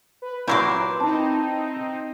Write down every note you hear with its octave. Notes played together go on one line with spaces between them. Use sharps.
B4
A#2 F#3 E4 C6 D6 G6
C4 D#4 A5